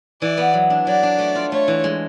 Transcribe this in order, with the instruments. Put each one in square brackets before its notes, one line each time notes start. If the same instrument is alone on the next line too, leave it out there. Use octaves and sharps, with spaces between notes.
[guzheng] E3 [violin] D5
[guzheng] B3
F#3
D4
[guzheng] F#3 [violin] D5
[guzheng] D4
A3
F4
[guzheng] A3 [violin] C#5
[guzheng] E3
G#3